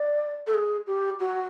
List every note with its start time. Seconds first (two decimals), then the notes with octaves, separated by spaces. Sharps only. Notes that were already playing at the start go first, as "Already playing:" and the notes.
Already playing: D5
0.47 A4
0.54 G#4
0.87 G4
1.20 F#4